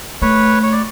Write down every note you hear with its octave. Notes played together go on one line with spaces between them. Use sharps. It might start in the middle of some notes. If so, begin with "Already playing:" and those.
A3 B4 C#5
C#5
D5